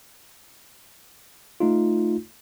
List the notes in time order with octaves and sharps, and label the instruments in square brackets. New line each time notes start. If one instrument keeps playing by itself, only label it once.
[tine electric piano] A3 D#4 F4